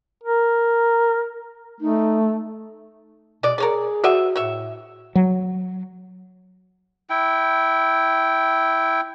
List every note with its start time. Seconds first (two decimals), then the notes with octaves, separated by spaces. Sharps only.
0.23 A#4
1.81 A3 D#4
3.43 B2 G#3 D5
3.58 G#4 A#4 C#5 D5
4.04 F#4 C5 D5 E5 F#5
4.36 A2 C#5 E5
5.15 F#3
7.10 E4 G5